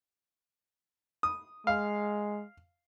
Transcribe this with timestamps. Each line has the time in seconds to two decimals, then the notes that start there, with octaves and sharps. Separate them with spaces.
1.23 D#6
1.67 G#3 F5